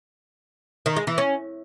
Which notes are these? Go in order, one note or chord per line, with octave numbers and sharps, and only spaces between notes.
D#3
G#3
E3
C#4